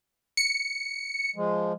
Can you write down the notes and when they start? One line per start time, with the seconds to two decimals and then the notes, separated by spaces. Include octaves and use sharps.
0.37 C#7
1.36 F3 G#3